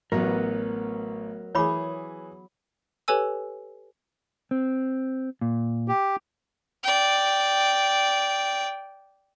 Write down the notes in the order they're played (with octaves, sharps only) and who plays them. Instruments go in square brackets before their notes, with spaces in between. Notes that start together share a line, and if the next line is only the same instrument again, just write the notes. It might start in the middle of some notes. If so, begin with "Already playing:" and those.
[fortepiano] A1 [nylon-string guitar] F#3 B3 [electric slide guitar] A#4 B4
[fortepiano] E3 G#4 [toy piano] C#5 B5 D6
[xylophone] G4 A4 B4 C#5 G#5 E6
[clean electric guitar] C4
A#2
[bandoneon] G4
[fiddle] D5 G5